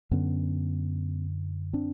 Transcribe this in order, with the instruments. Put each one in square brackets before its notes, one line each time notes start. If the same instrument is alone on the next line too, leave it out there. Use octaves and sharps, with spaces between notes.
[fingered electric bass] F#2 D3 B3 C#4
C4 D4